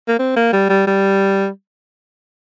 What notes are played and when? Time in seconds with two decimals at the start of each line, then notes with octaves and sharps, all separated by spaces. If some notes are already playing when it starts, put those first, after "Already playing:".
0.08 A#3
0.19 C4
0.36 A#3
0.53 G3
0.69 G3
0.87 G3